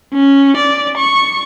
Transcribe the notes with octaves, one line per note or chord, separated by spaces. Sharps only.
C#4
D5
C#6